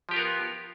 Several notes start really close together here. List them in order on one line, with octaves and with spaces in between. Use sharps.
F3 G4 F4 A#4 B3